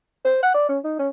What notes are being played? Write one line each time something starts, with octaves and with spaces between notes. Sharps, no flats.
C5
F#5
D5
C#4
D#4
C#4